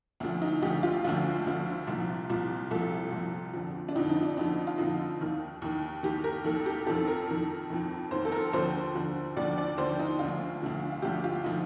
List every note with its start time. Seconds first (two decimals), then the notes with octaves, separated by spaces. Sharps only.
0.20 D2 D3 F3
0.42 D#4
0.62 D2 D3 F3 G4
0.83 F4
1.04 D2 D3 F3 F4
1.46 D2 D3 F3
1.87 C2 A#2 F3
2.30 C2 A#2 F3
2.71 C2 A#2 F3 A4
3.12 C2 A#2 F3
3.53 F2 D3 F3
3.89 D4
3.95 F2 D3 F3 D#4
4.09 D#4
4.23 D4
4.37 F2 D3 F3 D#4
4.67 F4
4.78 F2 D3 F3 D#4
5.21 D#2 D#3
5.62 D#2 D#3
6.03 D#2 D#3 G4
6.24 A#4
6.45 D#2 D#3 A4
6.66 G4
6.87 F2 D#3 A4
7.07 A#4
7.28 F2 D#3
7.70 F2 D#3
8.11 F2 D#3 C5
8.25 A4
8.32 A#4
8.53 D#2 D3 F3 C5
8.95 D#2 D3 F3
9.37 D#2 D3 F3 D5
9.58 D5
9.78 D#2 D3 F3 C5
9.99 D#4
10.19 D2 D3 F3 F4
10.62 D2 D3 F3
10.92 F4
11.02 D2 D3 F3 G4
11.24 F4
11.44 D3 F3 D#4